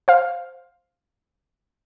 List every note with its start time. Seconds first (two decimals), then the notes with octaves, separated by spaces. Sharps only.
0.08 C5 F5